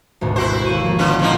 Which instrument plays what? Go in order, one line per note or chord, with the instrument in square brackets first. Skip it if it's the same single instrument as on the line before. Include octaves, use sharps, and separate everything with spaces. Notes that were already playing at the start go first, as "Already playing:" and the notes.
[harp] G#1 D2 B2
[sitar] E4 F#4 C5
[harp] D#2 C#6 D#7
F3 A#3
[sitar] D3 B3 C#4 [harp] D#3 E4
[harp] A#1 [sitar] D3 F3 D#4